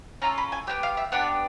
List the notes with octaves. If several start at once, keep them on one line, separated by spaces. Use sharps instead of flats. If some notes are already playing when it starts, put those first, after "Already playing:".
C#4 F4 A4 A#5
B5
G#5
B3 D4 G4 G5
F5
E5
B3 D4 G4 F#5